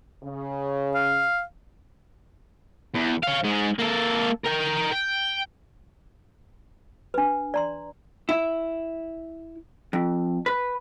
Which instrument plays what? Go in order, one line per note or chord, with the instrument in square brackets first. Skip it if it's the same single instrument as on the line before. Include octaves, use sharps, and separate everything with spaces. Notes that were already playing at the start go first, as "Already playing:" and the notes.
[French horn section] C#3
[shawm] F5
[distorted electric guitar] E2
C#5 F5
G#2 G#3
A#3 A4
A#4 G5
G5
[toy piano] D4 B4
D5 A#5 C6
[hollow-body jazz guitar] E4
F2
B4